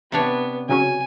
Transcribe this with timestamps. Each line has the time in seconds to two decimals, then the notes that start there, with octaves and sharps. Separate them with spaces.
0.12 C3 B3 D4 C#5
0.69 C#3 F#3 C#4 G#5